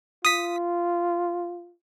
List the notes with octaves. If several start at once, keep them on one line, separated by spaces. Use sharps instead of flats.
F4 D#6 B6